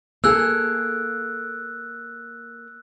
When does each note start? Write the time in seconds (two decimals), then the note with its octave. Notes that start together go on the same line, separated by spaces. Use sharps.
0.24 A#3 G#4 A4 E6 F#6